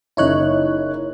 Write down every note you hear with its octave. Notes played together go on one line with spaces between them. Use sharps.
F#1 D#4 E4 C#5 F#6